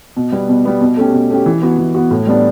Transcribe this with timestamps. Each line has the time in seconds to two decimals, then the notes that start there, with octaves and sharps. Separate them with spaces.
0.17 B2
0.32 G3 B3
0.49 B2
0.65 G3 B3
0.81 B2
0.97 A3 C#4 G4
1.13 B2
1.30 A3 C#4 G4
1.46 E3
1.62 B3 F#4
1.78 E3
1.95 B3 F#4
2.11 A2
2.27 G3 B3 D4